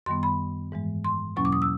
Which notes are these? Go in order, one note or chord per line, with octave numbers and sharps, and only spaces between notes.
F#2 D#3 G3 B3 C6
B5
G#2 E3 G#3
C6
E2 B2 F#3 A#3 C#4 C#6
D6
D#6
E6